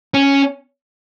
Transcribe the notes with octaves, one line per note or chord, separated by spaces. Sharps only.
C#4